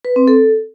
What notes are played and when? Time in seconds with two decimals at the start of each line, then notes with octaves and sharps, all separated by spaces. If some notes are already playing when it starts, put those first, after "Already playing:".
0.05 B4
0.16 C4
0.28 A4